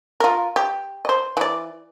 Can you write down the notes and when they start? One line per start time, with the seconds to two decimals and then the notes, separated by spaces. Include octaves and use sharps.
0.20 F4 A#4
0.56 G4
1.05 C5 D#5
1.37 E3 D5